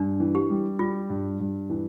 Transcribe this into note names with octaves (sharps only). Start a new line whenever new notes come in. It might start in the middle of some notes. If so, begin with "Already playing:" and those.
Already playing: G2 D4
E3
G4
G3
G3 F4
G2
G2
E3